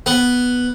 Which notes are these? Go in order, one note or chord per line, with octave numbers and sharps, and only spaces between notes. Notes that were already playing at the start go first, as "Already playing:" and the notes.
B3